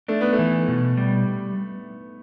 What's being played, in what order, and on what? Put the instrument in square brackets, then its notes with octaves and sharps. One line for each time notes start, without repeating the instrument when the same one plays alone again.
[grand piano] A3 [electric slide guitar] D4
[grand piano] B3
A3
[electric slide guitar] E3
B2
G3